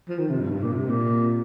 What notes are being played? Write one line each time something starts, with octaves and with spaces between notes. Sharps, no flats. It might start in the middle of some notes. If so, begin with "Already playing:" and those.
F3
D#3
C3
G2
G2
A#2
C3
A#2